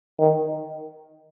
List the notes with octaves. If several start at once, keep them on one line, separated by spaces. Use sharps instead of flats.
D#3